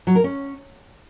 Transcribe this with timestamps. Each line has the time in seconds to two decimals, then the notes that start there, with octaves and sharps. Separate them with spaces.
0.07 F#3
0.15 A#4
0.24 C#4